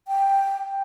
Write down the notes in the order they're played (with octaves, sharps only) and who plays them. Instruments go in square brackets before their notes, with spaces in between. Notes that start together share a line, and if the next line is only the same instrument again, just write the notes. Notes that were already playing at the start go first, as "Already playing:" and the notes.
[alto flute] G5